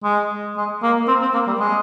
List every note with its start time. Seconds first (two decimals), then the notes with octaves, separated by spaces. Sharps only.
0.04 G#3
0.57 G#3
0.83 A#3
1.08 C4
1.22 C4
1.34 A#3
1.47 G3
1.60 G#3